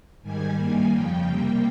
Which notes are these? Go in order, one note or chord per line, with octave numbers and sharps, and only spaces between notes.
G#2 D#3 G3 G#5
G2 D#3 G3 A#3 G#5
F2 C#3 F3 G5
C3 G3 A#3